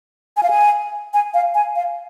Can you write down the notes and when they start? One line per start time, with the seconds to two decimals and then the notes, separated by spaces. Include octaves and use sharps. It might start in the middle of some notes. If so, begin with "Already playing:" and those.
0.37 G#5
0.43 F5
0.50 G#5
1.14 G#5
1.34 F5
1.55 G#5
1.75 F5